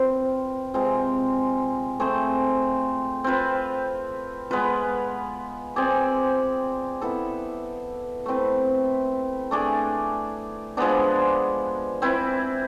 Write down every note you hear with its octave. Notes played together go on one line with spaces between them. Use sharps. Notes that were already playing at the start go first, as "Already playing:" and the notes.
Already playing: C4 F4 B4
C3 G#3 C4 F4
A3 C4 G#4 C5
C4 F4 B4
G#3 B3 F4 B4
C4 G#4 D5
B3 E4 A4
A3 C4 E4 B4
A3 D4 G#4 D5
F3 G#3 B3 D4
C4 E4 B4